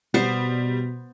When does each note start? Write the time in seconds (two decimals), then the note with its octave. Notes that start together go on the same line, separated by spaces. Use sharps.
0.14 B2 G3 B3 C5